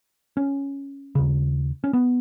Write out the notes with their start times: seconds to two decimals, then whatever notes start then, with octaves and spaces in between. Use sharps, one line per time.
0.37 C#4
1.15 D#2 C#3
1.84 C#4
1.93 B3